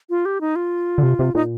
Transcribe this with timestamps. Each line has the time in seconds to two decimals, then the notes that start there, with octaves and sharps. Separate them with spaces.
0.10 F4
0.25 G4
0.41 D#4
0.56 F4
0.98 D3
1.03 C3
1.19 C3
1.35 A#2 D#4